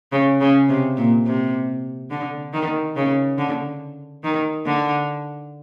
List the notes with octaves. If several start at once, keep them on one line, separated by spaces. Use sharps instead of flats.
C#3
C#3
C3
A#2
C3
D3
D#3
C#3
D3
D#3
D3